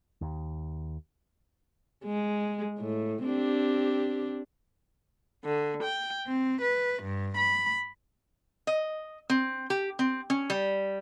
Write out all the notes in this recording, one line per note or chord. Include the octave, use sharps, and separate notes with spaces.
D#2
G#3
A2
C4 D4 G4
D3
G5
C4
B4
G2
B5
D#5
C4
G4
C4
C#4
G3